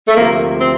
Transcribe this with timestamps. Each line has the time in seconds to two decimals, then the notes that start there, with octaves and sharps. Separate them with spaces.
0.07 A3
0.16 D2 C3 F3 A#3
0.61 C4